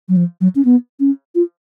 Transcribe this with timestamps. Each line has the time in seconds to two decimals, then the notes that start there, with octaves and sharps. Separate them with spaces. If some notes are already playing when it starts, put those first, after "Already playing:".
0.09 F#3
0.17 F3
0.41 F#3
0.55 C#4
0.65 B3
1.00 C#4
1.35 F4